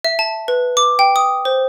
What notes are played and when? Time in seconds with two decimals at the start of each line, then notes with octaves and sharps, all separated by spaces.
0.05 E5
0.19 A5
0.48 B4
0.77 D6
0.99 G5
1.16 D#6
1.45 C5